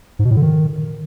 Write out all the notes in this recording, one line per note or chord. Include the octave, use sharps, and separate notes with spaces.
G#2
B2
A2
D3
D#3